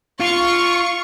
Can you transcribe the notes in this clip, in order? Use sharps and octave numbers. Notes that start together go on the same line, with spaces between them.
F4 C#6